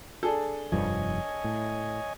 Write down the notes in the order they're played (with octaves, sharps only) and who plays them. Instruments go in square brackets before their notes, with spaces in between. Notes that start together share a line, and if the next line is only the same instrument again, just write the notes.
[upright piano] D4 G#4 A4
[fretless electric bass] F1 G2 F3 [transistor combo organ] C#5 D#5 G#5
[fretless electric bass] A2